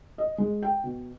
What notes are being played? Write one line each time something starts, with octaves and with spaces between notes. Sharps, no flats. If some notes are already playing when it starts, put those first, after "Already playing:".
D#5
G#3
G5
B2